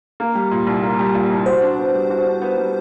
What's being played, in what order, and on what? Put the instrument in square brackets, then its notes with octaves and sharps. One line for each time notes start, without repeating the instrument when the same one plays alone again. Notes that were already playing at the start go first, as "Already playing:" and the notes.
[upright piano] A#3
G3
A#2
C2
A#3
G3
A#2
C2
[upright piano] F#4 [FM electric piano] C5
[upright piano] D4
B3
G3
F#4
D4
B3
G3